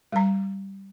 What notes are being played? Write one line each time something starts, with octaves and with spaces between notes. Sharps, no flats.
G3 A#5